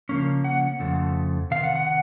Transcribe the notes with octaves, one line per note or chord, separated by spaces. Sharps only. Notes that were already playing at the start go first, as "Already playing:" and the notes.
C#3 F3 A#3 C#4
F#5
F2 C#3 F3 A3
C3 D#3 F5
F#5
F#5
F#5